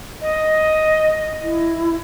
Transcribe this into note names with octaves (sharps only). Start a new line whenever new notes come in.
D#5
E4